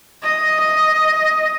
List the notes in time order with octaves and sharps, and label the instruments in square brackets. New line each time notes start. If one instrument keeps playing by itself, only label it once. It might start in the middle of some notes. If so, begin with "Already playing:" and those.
[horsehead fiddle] D#5